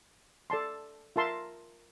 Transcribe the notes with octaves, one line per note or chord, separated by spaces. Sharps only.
A4 D5 A5 C6
F4 A#4 E5 A5 C6